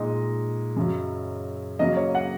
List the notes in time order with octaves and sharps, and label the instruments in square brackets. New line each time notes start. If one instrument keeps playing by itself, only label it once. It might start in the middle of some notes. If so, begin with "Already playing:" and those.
Already playing: [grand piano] A#2 G#3 D#4 [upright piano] D#5
[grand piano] F#2 C#3 F#3 C#4
[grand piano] C#3 F#3 A#3 C#4 [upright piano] D#5
[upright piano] C#5
F#5